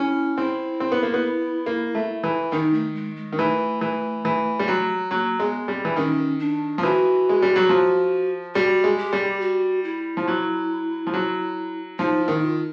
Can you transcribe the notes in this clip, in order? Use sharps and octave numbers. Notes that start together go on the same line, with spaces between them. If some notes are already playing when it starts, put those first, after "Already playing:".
Already playing: C#4 E4
C4 E4
C4
B3
A#3
B3
A#3
A3
E3
D#3 D#4
A3
G#3
G#3
D#3
E3 A3
E3
E3
G3
F#3
F#3 A#3
G#3 B3
G3 C4
E3
D#3 C#4
D4
F3
E3 F#4
G#3
G3
F#3
F3
G3 F#4
G#3
G4
G3
F#4
E4
F3
F#3
F3
F#3
F3 D#4
E4
D#3
F4